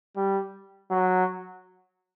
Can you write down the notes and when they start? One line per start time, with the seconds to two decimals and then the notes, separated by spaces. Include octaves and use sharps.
0.16 G3
0.91 F#3